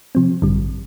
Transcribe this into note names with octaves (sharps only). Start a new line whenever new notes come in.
C3 F3 C4
A1 G2 D3 G3